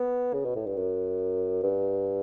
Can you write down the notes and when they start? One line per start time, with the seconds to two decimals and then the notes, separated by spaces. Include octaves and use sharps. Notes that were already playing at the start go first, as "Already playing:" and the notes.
Already playing: B3
0.34 C#3
0.45 B2
0.55 A2
0.66 G2
0.77 F#2
1.63 G2